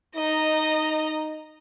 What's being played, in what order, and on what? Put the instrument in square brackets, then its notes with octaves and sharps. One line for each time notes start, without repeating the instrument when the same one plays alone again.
[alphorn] D#4 [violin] D#5 A#5